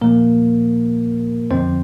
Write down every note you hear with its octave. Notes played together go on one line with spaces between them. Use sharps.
A#2 F3 A3 A#3 A#4
F2 D3 F3 C4 C5